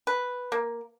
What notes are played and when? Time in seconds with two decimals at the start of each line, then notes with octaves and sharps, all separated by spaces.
0.07 B4
0.52 A#3